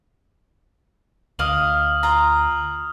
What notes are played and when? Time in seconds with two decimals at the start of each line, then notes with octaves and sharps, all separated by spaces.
1.39 D2 D#5 F5 D6 D#6 F6 F#7
2.03 F4 A#5